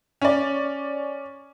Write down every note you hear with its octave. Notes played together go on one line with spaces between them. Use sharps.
C#4 D5